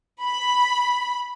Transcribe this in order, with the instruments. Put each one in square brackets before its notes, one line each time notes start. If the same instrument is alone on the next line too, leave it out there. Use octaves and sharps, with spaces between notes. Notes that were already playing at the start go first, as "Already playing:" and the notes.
[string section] B5